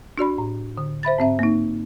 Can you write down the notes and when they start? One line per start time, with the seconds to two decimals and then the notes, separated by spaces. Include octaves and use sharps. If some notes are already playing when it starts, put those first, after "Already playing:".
0.18 D4 F#4 D5 B5
0.38 A2
0.78 D3
1.03 C5 E5 B5 A6
1.18 G#2 C4 E5
1.39 A#3 D#4